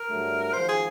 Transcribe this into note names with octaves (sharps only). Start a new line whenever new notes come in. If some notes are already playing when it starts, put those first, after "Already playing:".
Already playing: A#4
G2 D3 F#3 A3
G#1 G#2 F3 C5
G#4